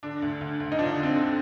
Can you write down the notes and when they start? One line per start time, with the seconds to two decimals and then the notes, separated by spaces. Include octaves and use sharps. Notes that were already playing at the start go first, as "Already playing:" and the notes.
0.03 D3 D4
0.22 D2
0.41 D2
0.60 D2
0.72 D#4
0.79 F3 D4
0.96 D3
1.03 C4
1.16 D3